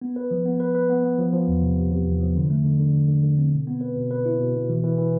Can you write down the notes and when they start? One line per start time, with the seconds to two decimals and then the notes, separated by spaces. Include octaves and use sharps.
0.02 B3
0.16 B4
0.31 F3
0.46 B3
0.60 B4
0.75 B4
0.90 B3
1.04 B3
1.18 F3
1.33 F3
1.48 E2
1.62 C3
1.77 C3
1.91 C3
2.06 E2
2.20 F3
2.35 D3
2.50 A3
2.64 D3
2.80 D3
2.94 D3
3.08 D3
3.23 D3
3.38 C4
3.52 B2
3.67 B3
3.81 B4
3.96 B2
4.11 B4
4.25 E4
4.40 B2
4.55 B2
4.69 E3
4.84 E3
4.98 E3